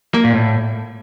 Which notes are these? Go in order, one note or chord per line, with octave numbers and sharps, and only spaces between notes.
A#3
A#2
A2